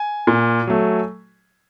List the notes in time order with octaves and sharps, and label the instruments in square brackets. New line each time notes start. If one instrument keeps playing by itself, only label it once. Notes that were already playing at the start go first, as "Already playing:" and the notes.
Already playing: [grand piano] G#5
A#2
F#3 A3